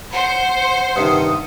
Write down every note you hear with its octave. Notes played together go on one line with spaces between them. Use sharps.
C5 F#5
G2 C3 D#3 D#6